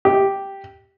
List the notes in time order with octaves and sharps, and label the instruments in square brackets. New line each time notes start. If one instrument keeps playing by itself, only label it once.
[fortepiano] G4